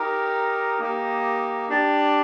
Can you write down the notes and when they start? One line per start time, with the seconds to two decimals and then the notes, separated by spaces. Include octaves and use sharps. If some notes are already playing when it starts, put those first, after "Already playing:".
Already playing: D#4 G4 A#4
0.80 A#3 D#4 G4
1.69 D4 G4 D5